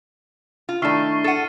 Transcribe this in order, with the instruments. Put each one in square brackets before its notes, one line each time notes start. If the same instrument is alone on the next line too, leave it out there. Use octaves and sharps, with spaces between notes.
[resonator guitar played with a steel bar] F4
[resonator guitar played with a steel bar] D#3 A3 [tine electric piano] D4 E4 E5 [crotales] C#6 F6 C7
[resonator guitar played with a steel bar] A4 F#5 [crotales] A6 D#7